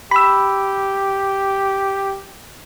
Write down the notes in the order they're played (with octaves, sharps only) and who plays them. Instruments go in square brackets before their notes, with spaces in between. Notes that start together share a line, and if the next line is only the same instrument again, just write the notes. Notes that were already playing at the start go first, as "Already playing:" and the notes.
[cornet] G4 [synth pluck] B5 E6